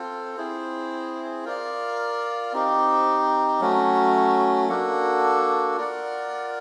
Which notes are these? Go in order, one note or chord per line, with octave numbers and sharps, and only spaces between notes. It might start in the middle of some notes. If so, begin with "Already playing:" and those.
Already playing: C4 F4 A4 C5
C4 E4 G#4 C5
F4 A#4 D5 F5
C4 D#4 G4
F#3 A3 C#4 F#4
A#3 D4 F#4 A4
F4 A#4 D5 F#5